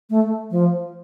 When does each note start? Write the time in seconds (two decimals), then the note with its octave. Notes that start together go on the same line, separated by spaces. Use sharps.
0.10 A3
0.51 F3